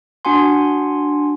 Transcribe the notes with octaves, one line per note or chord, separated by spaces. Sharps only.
D4 F#4 F#5 G#5 C6